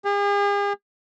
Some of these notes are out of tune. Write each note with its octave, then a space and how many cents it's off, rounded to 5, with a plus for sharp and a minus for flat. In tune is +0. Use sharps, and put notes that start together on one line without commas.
G#4 -45